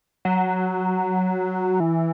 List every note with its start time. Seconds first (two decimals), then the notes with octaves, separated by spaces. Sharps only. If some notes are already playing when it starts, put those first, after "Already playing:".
0.25 F#3
1.80 E3